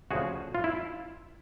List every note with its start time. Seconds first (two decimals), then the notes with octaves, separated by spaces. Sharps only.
0.11 D2 C#3 F3 F#4 G#4
0.55 F4
0.64 E4